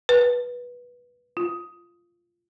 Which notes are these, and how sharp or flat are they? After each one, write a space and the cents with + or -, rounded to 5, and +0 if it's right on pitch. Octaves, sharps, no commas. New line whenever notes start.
B4 -15
F4 -10